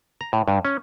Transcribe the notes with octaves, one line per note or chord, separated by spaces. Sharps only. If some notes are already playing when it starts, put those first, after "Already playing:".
A#5
A2
G2
C#4